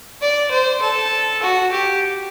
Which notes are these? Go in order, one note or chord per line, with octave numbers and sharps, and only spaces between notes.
D5
C5
A4
F#4
G4